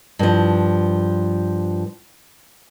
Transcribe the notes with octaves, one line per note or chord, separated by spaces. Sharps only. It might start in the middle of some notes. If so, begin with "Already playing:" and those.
G2 F3